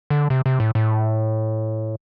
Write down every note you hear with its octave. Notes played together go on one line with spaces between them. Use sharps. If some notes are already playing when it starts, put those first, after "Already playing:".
D3
C3
C3
A2
A2